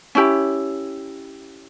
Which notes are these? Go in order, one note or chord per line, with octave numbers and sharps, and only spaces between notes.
C#4 E4 G4